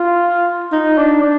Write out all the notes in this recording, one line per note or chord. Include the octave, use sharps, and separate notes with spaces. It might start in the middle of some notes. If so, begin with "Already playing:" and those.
Already playing: F4
D#4
D4
D4